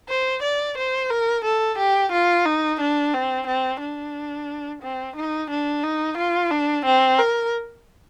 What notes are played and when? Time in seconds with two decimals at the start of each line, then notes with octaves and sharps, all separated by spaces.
0.09 C5
0.43 D5
0.77 C5
1.11 A#4
1.45 A4
1.78 G4
2.12 F4
2.46 D#4
2.80 D4
3.14 C4
3.47 C4
3.80 D4
4.82 C4
5.16 D#4
5.50 D4
5.83 D#4
6.18 F4
6.51 D4
6.86 C4
7.19 A#4